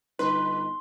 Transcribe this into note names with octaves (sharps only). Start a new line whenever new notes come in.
G1 D#4 B4 C6